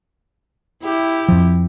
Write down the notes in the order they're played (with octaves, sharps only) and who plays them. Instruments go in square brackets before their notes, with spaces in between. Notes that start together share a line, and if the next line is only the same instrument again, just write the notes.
[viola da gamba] E4 G4
[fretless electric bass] F2 F3